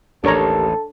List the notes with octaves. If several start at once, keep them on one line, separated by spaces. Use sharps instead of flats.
A1 D#2 D4 G4 A4 A#4 C#5 A#5